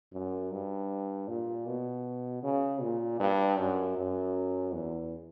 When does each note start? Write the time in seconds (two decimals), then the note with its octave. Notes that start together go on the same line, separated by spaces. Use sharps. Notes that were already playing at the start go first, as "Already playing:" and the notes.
0.13 F#2
0.52 G2
1.28 A#2
1.66 B2
2.43 C#3
2.82 A#2
3.20 G2
3.58 F#2
3.97 F#2
4.73 E2